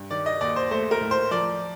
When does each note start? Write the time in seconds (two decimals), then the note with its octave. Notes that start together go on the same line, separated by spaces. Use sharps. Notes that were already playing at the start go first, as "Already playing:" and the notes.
Already playing: G2
0.11 D#3 D5
0.26 D#5
0.41 D#2 D5
0.56 C5
0.71 A3 C5
0.91 A#4
1.01 A2
1.11 C5
1.31 F3 D5